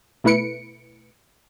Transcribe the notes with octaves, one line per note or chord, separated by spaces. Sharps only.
B2 A3 E4 B4 C#7 D7